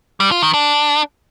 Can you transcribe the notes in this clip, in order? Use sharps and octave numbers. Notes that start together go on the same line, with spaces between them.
G3
F4
D#3
D4